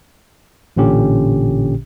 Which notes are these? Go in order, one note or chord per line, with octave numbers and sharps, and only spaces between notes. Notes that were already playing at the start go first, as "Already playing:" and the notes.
A1 A#2 D3 C#4 G4